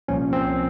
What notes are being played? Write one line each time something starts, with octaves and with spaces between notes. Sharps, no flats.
C2 A#2 F3 C#4
C4